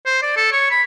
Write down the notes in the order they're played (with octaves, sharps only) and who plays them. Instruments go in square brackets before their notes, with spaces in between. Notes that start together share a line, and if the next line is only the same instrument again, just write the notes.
[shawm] C5
D5
A4
C#5
B5